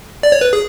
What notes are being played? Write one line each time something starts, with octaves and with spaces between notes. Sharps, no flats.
D5
C#5
B4
G#4